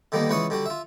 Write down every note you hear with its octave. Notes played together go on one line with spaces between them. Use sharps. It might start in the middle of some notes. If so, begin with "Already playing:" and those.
D3 D#3 G3 A#3 B3
C#2 E3 B4 F#5 C#6 D#6
D3 G3 F#4
F4 E5